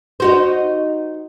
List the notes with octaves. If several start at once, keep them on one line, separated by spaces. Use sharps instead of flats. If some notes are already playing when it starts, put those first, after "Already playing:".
D#4 F#4 C5